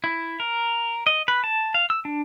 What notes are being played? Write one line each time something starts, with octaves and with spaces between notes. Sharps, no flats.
E4
A#4
D#5
B4
A5
F5
E6
D4